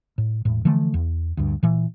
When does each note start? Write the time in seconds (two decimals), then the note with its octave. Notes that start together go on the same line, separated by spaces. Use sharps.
0.18 A2
0.45 E1 A2
0.65 D3 E3 F3 A3
0.94 E2
1.37 D2 G2
1.63 A#2 E3